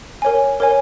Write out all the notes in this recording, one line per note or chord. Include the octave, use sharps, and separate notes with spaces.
A#4 C#5 G#5
A#4 C#5 G#5